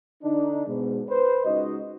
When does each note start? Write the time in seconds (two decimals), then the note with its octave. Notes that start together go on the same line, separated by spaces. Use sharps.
0.23 D3 D4 D#4
0.67 G#2 B2
1.09 B4 C5
1.45 C#2 D#4 F#4 D#5